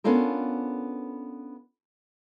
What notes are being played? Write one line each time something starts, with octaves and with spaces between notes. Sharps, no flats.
B3 C#4 D4 F4 A4 A#4